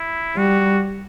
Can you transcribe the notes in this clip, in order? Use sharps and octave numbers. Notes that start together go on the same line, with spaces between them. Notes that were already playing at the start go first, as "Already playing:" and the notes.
Already playing: E4
G3 F#4